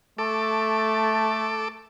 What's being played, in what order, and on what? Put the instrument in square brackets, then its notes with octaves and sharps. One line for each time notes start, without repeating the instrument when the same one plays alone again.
[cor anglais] A3 [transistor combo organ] A4 D6